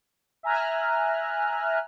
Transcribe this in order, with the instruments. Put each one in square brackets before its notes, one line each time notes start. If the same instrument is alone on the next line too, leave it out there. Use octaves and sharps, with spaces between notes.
[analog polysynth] E5 G#5 A#5 F6 F#6